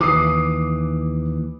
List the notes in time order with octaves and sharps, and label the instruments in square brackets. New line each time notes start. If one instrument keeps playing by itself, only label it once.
[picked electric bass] D#2 E3 [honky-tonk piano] D6 D#6 C7